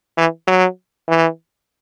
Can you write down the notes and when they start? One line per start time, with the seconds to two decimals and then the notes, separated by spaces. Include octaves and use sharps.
0.17 E3
0.47 F#3
1.08 E3